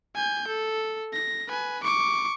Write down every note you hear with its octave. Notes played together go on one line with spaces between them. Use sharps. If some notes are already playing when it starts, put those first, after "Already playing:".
G#5 G6
A4
A#6
B4 G#5
C#6 D6